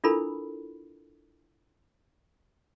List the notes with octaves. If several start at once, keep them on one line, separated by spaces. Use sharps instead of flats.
D4 E4 F4 A4 A#4 B5